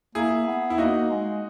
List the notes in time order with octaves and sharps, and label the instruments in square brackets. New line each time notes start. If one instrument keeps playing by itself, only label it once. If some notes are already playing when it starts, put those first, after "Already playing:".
[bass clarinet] A#3 [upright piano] E4 G#4
[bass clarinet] B3
[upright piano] E4
[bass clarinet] A#3 [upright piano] D#4 F#4
[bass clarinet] G#3